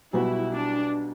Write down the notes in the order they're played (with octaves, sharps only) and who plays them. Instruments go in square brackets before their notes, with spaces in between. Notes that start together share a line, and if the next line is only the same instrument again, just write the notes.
[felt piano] B1 B2 G3 B3 F#4 [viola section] E4
[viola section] D4